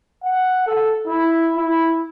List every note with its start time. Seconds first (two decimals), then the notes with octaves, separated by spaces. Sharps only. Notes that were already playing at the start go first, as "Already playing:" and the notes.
0.24 F#5
0.67 A4
1.07 E4
1.57 E4